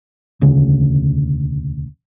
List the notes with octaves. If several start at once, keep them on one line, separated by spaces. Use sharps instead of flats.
E1 D2 C#3